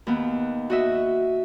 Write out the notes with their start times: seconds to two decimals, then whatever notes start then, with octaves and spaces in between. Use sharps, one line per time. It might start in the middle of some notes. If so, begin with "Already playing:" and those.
0.07 D#2 B3
0.70 F#4 D#5 E5